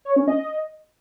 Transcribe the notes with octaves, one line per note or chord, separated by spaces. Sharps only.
C#5
C#4
D#5